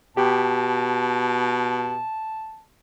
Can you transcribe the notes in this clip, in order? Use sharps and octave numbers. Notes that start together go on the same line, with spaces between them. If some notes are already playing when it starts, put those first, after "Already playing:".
B2 G4 A5